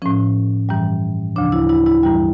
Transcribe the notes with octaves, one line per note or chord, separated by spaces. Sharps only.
A2 F3 C#4
G2 E3 G3
D2 C#3 F3 D4
E4
E4
E4
G2 E3 G3